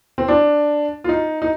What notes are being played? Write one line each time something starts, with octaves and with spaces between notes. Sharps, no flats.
C4
D4
F4
D#4
D#4